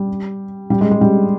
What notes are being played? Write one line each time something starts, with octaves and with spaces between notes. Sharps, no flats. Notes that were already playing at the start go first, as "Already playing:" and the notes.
Already playing: G3
G3
G#3
G#3
G3